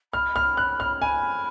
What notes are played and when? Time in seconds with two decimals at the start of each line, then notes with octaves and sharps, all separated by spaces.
0.13 B5 F6
0.36 F6
0.57 F#6
0.80 F6
1.02 G#5 B5